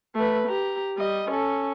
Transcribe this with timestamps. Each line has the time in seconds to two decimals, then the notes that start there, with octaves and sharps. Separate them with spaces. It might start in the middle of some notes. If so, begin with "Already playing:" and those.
0.15 A3 B4
0.48 G4 A#5
0.98 G3 D#5
1.30 C#4 A4